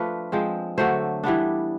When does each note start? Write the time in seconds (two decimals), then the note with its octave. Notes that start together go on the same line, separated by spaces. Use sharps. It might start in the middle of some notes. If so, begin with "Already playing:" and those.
Already playing: F3 A3 D4 F4 B4
0.32 F3 G#3 C4
0.78 D3 F#3 A3 C5
1.23 E3 G3 B3 D4